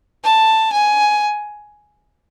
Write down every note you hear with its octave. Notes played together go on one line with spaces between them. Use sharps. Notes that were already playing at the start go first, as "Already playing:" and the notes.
A5
G#5